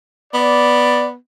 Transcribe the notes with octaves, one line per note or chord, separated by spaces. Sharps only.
B3 D5